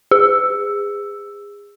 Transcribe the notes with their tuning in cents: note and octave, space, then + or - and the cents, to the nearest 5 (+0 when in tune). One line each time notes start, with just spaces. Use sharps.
G#4 -30